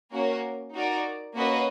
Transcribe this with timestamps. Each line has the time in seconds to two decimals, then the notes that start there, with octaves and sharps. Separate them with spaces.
0.13 A#3 C#4 F#4 A#4
0.73 D#4 F#4 A#4 D5
1.35 A#3 C#4 F#4 B4 D#5